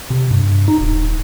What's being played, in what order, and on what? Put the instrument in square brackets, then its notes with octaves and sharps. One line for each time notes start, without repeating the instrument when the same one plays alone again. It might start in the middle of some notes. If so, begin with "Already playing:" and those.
[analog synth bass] C3
G2
D#4
D#1